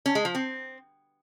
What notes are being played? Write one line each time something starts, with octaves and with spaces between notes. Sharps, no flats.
C#4
G#3
F3
C4